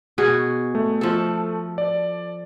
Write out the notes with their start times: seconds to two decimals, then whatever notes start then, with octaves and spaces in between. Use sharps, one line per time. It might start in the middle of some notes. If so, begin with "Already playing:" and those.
0.18 B2 F#4 G#4
0.75 A3
1.01 F3 A4
1.78 D5